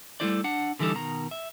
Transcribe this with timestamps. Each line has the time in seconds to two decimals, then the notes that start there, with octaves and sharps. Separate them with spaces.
0.20 G3 A3 A#3 E4 C5 D5
0.44 D4 F#5
0.79 D3 E3 G3 D#4 A4
0.95 B2 D#3 A#5
1.31 E5